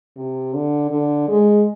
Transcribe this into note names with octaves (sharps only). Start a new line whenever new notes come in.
C3
D3
D3
G#3